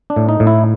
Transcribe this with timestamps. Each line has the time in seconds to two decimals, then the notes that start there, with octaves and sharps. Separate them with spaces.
0.10 D4
0.16 A2
0.29 D#4
0.40 A2
0.47 E4